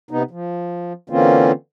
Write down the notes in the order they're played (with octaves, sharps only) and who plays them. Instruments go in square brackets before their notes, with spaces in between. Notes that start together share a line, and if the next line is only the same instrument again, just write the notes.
[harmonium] C3 B3 D#4
F3
D3 E3 A#3 C4 C#4 F4